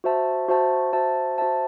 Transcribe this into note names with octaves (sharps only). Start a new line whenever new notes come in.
F#4 C5 E5 A5
F#4 C5 E5 A5
F#4 C5 E5 A5
F#4 C5 E5 A5